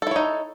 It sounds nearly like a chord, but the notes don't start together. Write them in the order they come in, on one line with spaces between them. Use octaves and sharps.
A4 E4 C#5 D#4